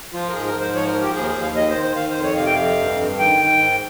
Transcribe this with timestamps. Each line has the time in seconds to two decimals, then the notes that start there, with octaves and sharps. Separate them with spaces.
0.13 F3 F4
0.29 A#4
0.33 G#2 G#4
0.46 A#4
0.54 G#2
0.60 C5
0.74 F3 C#5
0.87 A#4
0.95 F3
1.01 G4
1.14 D#2 G#4
1.23 A#4
1.28 G#4
1.35 D#2
1.42 F5
1.56 D#3 D#5
1.70 C5
1.76 D#3
1.83 C5
1.96 D#3 F5
2.10 C5
2.17 F2
2.23 C#5
2.36 C3 F5
2.46 G5
2.55 F2 F5
2.78 G2
2.99 G2
3.18 D#3 G5
3.39 D#3
3.59 G#2